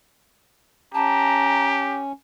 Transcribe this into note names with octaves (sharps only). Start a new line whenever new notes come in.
C#4 G4 A5 A#5